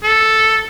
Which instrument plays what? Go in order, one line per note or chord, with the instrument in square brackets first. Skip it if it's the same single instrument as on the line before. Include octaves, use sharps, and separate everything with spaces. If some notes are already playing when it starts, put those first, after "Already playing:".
[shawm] A4